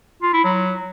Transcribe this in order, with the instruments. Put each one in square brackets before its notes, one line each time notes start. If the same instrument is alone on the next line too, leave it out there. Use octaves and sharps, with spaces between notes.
[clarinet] F4
E4
F#3